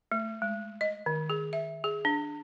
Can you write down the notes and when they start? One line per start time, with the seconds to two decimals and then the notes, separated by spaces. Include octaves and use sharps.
0.12 A3
0.42 G#3
0.81 D#5
1.06 D#3
1.30 G#4
1.53 E5
1.84 G#4
2.05 D4